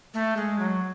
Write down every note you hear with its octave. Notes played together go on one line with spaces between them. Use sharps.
A3
G#3
F#3